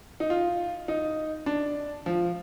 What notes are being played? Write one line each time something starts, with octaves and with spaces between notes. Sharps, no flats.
D#4
F4
D#4
D4
F3